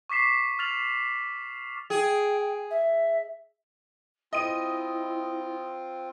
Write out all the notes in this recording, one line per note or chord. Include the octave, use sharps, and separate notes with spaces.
C#6 D6 B6 C7 E7
F6 A6 F7 F#7
G#4 G5
E5
C4 E4 F4 D#5 D#7